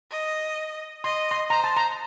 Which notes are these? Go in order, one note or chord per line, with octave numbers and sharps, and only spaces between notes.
D#5
D#5 C6
C6
C5 A#5
A5
A#5